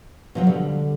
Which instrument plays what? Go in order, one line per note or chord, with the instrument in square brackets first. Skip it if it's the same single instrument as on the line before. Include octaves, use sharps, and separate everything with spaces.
[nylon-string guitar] B2 F3 F#3
[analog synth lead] D3 [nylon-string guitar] G3